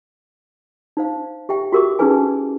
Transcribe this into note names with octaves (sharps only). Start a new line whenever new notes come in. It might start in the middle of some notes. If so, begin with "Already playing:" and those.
D#4 C5 F5
G4 E5 G5
F#4 G4 A#4 E5 D6
C#4 D#4 E4 G#4 B4 G#5